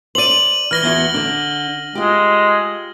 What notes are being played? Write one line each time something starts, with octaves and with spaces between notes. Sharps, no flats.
C5 D5 D#7 F#7
E3 F6 A#6 G7
E2 F#4
D3 D4
G#3 F4 G4